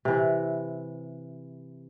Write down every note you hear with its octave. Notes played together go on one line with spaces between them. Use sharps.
C3 E3